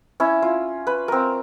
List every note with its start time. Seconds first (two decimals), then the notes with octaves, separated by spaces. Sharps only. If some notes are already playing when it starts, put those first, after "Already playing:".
0.20 C#4 E4
0.42 F4
0.87 B4
1.08 C4 A#4